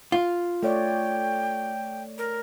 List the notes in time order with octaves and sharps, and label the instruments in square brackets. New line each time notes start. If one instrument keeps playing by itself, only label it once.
[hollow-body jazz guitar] F4
[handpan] A3 C#5 D5 [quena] G5
[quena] A#4